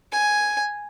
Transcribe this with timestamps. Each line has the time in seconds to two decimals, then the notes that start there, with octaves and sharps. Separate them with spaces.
0.12 G#5